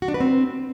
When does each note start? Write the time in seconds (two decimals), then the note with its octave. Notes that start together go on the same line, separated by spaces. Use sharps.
0.02 F#4
0.08 D4
0.14 B4
0.20 C4